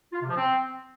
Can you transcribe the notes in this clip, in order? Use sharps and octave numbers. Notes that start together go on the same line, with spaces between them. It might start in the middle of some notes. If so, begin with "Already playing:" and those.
F4
C3
F3
C4